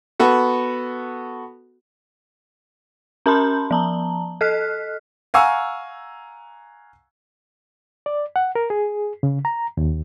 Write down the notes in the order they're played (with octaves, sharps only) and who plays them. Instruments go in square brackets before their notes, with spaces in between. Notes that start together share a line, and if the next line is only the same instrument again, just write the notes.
[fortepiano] B3 F#4 A4
[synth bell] C#4 A#4 A5 B5 C6 G6
F3 A5 A#5
A4 D#5 F6 F#6 B6
[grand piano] F5 F#5 G#5 A#5 C#6 E6
[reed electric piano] D5
F#5
A#4
G#4
C#3
A#5
D#2